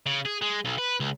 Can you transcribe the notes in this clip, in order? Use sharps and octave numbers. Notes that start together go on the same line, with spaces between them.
C#3
G#4
G#3
B1
B4
C#2